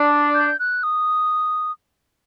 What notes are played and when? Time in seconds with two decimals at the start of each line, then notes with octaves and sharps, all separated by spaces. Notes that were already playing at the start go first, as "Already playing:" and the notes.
Already playing: D4
0.34 G6
0.59 F#6
0.83 D#6